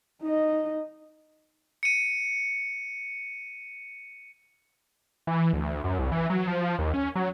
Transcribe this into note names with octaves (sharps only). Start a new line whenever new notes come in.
D#4 D#5
C#7 D#7
E3
D2
F#2
C2
E3
F#3
F3
D#2
C#4
F#3